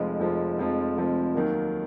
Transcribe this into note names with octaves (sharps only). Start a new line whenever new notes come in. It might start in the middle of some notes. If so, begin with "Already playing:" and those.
Already playing: F1 F2 F3 G#3
F1 F2 F3 G#3
F1 F2 F3 G#3
F1 F2 F3 G#3
D#2 D#3 F#3 A#3